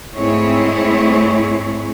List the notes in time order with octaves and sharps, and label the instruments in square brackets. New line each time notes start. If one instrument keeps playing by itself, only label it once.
[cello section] G#2 A3 C4 E4 G#4 C#5